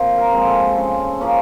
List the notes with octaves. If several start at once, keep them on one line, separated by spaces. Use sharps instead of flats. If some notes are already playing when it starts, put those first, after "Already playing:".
Already playing: A#2 F3 C4
A#4
F3 G#3 C4
A4
C#3 A4
F3 A#3 C#4